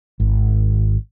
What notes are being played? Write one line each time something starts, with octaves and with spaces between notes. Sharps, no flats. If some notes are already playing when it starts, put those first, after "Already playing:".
G#1